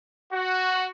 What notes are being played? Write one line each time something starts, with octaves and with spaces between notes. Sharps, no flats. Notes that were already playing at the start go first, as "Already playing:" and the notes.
F#4